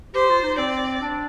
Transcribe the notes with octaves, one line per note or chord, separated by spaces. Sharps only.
G4 C5
F4
D#4
C4 D5
D4